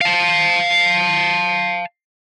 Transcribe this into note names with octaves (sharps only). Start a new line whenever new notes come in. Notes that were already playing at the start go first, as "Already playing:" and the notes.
F5 A5